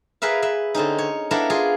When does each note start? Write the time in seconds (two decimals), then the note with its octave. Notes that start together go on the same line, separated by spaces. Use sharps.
0.22 G#4 A#4 B4 E5 F5
0.42 B4 E5
0.74 D3 C4 C#4 D#4
0.98 C#5
1.31 B3 D4 E4 A4 A#4 F5
1.50 F4 G#4 F5